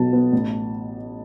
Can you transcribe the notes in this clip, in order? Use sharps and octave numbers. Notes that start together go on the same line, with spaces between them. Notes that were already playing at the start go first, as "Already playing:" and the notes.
Already playing: B1 B2 B3 A5
B3
A1